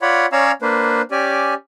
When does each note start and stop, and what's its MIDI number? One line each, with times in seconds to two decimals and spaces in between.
0.02 0.26 65
0.02 0.26 73
0.02 0.26 74
0.02 0.26 78
0.02 0.26 83
0.32 0.52 61
0.32 0.52 73
0.32 0.52 74
0.32 0.52 77
0.32 0.52 82
0.32 0.52 88
0.62 1.02 58
0.62 1.02 62
0.62 1.02 71
0.62 1.02 72
1.11 1.54 61
1.11 1.54 67
1.11 1.54 74
1.11 1.54 80